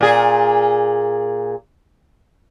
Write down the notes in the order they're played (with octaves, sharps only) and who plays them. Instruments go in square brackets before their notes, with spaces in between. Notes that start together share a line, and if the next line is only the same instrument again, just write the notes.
[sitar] A#2 G#4